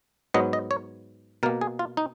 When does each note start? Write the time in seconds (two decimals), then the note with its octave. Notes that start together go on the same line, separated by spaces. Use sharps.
0.34 G#2 F#3 B3 D#5
0.53 D#5
0.71 C#5
1.43 B2 A#4
1.46 A#3
1.61 G#4
1.79 F4
1.97 D#4